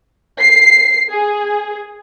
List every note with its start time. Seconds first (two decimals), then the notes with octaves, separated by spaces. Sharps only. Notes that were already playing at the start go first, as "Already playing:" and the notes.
0.40 C7
1.10 G#4